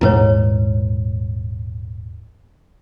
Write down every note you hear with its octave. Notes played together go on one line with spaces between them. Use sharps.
D#1 G#2 E4 B4 C#5